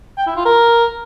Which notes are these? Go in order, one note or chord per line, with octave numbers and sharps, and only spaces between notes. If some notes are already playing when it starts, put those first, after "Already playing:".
G5
E4
F4
A#4